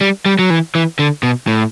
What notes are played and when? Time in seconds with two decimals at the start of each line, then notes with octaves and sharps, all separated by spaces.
0.01 G3
0.26 G3
0.39 F#3
0.50 E3
0.75 E3
0.99 D3
1.23 B2
1.48 A2